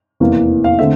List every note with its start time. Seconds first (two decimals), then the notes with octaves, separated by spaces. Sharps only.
0.20 F1 E2 E3 A#3
0.64 F5
0.79 D3 A3 C4 E5